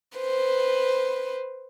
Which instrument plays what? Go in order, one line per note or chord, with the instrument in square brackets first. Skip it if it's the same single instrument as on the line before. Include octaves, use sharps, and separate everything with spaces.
[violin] B4 C5